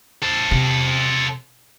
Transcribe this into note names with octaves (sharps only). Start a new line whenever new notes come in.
A4 C5
C3